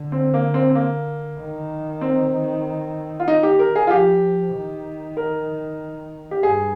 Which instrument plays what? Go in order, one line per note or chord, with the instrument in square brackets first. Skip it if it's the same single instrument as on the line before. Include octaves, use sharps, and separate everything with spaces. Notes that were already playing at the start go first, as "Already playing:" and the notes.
Already playing: [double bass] D3
[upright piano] C4
A#3
C4
C4
A#3
[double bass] D#3
[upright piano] C4
F4
D#4
G4
A#4
G#4
F4
[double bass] F3 [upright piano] G4
[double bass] D#3
[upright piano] A#4
G4
[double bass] G2 [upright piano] G#4